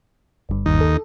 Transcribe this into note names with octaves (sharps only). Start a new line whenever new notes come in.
G1 G2
D#2 D#4
A4